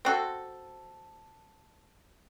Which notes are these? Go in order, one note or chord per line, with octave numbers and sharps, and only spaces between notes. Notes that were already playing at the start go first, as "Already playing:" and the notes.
C4 F#4 A4